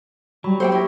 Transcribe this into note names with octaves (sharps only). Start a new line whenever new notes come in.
F#3 G3 G5 B5
A#3 G4 C5 F#5 G5 E6
E4 C#6 A#6